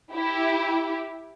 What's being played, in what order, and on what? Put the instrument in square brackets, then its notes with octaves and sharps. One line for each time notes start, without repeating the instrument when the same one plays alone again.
[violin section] E4 G4